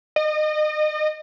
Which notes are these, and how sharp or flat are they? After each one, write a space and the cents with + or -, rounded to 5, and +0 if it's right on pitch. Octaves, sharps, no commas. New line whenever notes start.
D#5 -30